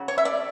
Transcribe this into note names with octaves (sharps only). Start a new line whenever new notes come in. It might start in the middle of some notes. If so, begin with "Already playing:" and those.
Already playing: C#3 F#3
C#5
E5
D5